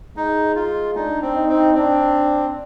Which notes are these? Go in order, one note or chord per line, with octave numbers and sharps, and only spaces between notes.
G#3 D#4
F4
D4 D#4
C4
D#4
C4
C4 D4